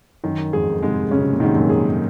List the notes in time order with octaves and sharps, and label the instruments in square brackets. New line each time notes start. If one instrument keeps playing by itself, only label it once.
[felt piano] F#2 [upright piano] D#3
[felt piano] F2 G#2 [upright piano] G#4
[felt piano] G#2 C3 [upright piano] G#3
[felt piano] C#3 [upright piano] C#4
[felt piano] C3
A#2
[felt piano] G#2 C3 [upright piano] D#3
[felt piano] F#2 A#2
[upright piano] G#4